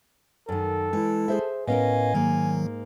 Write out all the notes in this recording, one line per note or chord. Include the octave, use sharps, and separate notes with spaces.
F#2 D#3 A4
E3 G#3 E4
G#4 C5 E5
A2 B3 C#4 A#4 D#5 F5 G#5
G#2 D#3 F#3 A#3